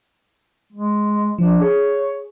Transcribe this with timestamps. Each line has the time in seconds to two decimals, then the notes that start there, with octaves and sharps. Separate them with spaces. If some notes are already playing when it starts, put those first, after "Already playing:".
0.72 G#3
1.38 F3 D4
1.61 G#4 C#5